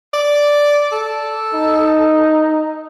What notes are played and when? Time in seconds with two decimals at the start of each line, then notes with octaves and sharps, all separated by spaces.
0.13 D5
0.92 A4
1.54 D#4